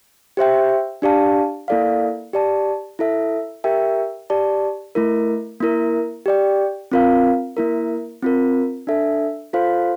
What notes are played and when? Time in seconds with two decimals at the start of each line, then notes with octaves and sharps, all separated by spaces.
0.37 G4 C5 E5 G5
1.02 D4 G4 D5 F5 A5
1.68 A#3 E4 A4 D5 F5
2.33 G4 D5 A5
2.99 E4 A4 E5
3.64 G4 A#4 E5 G5
4.30 G4 D5 A5
4.95 A3 E4 A#4
5.60 A#3 E4 A#4
6.26 G4 D5 G5
6.92 C4 F4 A#4 F5
7.57 A#3 E4 A#4
8.22 C4 F4 A#4
8.87 D4 A4 E5
9.53 F4 A4 C5 F5